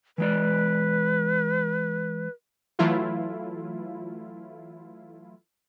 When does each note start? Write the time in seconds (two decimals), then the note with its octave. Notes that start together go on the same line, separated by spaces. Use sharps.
0.18 E3 G#3 B4 D5
2.79 E3 F#3 A3 E4 F4